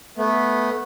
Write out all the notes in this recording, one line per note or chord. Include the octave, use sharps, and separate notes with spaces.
A3 B3